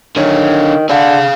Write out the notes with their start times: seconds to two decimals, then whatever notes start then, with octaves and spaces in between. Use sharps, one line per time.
0.16 D3 D#3 C#5
0.90 D3 G#4 F5